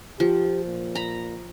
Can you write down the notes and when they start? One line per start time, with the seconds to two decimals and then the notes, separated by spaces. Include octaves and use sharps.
0.20 F3 G4
0.65 A#2
0.95 A#5 B5